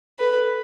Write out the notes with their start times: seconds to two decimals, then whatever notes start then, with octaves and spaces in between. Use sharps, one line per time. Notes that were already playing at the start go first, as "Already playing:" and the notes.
0.19 A4 B4